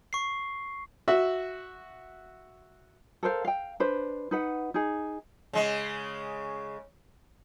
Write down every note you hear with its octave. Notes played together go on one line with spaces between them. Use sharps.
C#6 C7
F#4 E5
A4 A#4 C5 F5
F5 G5
D4 B4 C5
D#4 B4 F#5
D#4 G#4
C#3 G#3